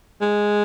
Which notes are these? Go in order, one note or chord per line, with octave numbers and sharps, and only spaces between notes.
G#3